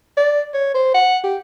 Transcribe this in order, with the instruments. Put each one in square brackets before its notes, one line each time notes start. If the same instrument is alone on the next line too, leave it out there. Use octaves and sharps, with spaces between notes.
[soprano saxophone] D5
C#5
C5
F#5
G4